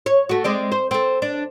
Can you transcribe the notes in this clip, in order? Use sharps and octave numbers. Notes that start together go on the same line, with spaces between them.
C#5
A3 F#4
G#3 C4 D5
C5
C4 A4
D4